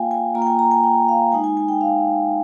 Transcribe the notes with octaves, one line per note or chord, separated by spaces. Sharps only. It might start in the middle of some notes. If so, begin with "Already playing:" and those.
Already playing: A#3 F4 F5 G5 G#5
G#5
A#3 F4 A#5
G5
G#5
A#5
G#5
G5
F5
G#3 D#4 G#5
G#5
G#5
G5
F5